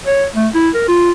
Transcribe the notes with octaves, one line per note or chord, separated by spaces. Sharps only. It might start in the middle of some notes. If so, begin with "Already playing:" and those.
C#5
A3
E4
A#4
F4